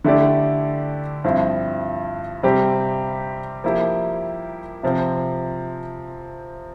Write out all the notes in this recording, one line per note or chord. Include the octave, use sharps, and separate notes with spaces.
D3 A3 E4 G4 D5
G2 F3 C4 E4
C3 G3 C4 G4
F3 A#3 E4 G4
C3 F3 C4